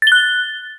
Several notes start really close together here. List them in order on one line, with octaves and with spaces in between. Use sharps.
A6 G7 F#6